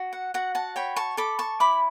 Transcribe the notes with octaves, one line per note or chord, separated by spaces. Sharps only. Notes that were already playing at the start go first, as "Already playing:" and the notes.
Already playing: F#4
F#5
F#4 F#5
F#5 A5
C#5 G5 B5
A5 C#6
A4 B5 D6
A5 C#6
E4 B5 D6